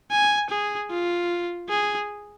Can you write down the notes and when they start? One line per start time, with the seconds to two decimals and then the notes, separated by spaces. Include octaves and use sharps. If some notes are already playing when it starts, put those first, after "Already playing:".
0.11 G#5
0.50 G#4
0.91 F4
1.69 G#4